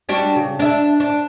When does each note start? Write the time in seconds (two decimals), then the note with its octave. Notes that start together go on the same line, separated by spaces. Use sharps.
0.09 G3 D4 F#4
0.36 C#3
0.59 D4 E5
1.00 D4